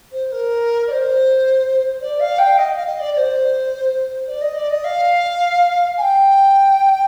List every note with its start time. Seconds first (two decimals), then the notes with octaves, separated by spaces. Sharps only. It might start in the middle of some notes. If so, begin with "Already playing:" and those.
0.12 C5
0.32 A#4
0.87 D5
0.91 C5
2.02 D5
2.20 F5
2.38 G5
2.58 D#5
2.77 F5
2.86 D#5
3.00 D5
3.14 D5
3.17 C5
4.27 D5
4.41 D#5
4.56 D5
4.70 D#5
4.84 F5
5.97 G#5
6.02 G5